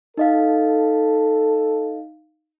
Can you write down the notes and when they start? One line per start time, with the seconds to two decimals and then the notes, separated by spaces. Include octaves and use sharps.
0.17 D#4 A4 D#5 F5